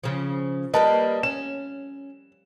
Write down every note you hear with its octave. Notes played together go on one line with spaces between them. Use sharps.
C#3 F3
G3 A#3 B4 D#5 A5
C#4 E7